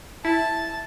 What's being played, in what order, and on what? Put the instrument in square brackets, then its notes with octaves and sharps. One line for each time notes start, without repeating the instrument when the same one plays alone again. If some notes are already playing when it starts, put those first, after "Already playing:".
[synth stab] E4 [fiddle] A5